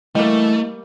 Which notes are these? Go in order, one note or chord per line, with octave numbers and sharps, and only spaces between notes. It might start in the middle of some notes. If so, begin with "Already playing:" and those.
E3 G3 A3 A#3 D#5